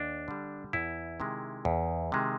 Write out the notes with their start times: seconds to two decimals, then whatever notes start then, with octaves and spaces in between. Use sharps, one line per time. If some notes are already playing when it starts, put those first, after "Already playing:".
Already playing: D#2 D4
0.28 D3 G3
0.73 E2 E4
1.20 C3 D#3 G#3
1.65 E2
2.12 C3 D#3 G#3